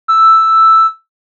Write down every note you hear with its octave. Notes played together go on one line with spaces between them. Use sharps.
E6